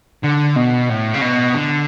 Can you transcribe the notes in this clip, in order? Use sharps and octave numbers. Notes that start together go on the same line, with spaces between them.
D3
B2
A2
C#3
B2
D3